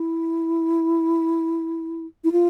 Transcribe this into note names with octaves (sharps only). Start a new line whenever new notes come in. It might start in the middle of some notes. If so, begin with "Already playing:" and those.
Already playing: E4
E4
F4